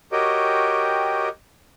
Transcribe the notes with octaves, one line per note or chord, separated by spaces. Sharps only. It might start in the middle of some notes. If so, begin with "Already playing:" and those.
F#4 G4 A#4 C#5 D#5 G5